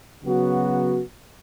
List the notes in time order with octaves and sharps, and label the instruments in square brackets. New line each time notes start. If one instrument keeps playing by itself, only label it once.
[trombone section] C#3 F#3 B3 F#4